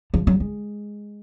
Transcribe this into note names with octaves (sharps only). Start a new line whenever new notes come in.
F3
F#3
G#3